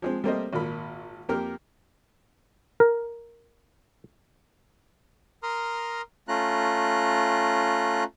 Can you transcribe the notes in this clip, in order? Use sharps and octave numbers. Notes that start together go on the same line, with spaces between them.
F3 G#3 C4
G3 A3 A#3 C4 C5 D#5
G#1 A#2 A#4 B5
F2 A#3 G4 A#4
A#4
A#4 A#5 C6 D#6 F6
A3 C#4 F4 A#5 F#6